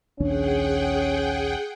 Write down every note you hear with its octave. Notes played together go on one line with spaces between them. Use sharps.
A#1 D#2 C#4 D4 G#4 F#5 G5